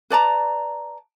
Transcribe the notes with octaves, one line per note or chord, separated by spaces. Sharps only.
B4 D5 A5 A#5